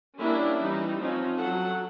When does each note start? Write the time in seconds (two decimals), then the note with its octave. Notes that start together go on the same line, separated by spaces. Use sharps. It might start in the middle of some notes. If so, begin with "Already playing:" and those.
0.19 G3 A#3 C#4 D4 E4
0.63 E3 G3 D#4
1.01 F3 C4 C#4 D#4
1.38 F#3 A4 F#5